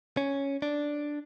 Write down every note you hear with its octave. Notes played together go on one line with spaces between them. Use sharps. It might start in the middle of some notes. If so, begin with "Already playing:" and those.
C#4
D4